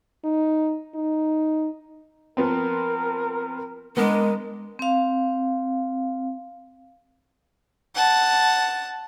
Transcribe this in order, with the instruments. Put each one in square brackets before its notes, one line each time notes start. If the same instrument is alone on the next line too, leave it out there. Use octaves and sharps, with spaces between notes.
[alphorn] D#4
D#4
[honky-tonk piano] F3 B3 C4 [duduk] A#4
[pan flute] G#3 [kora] B3 A#4 D#5 [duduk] D4
[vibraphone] C4 F5
[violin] F#5 A5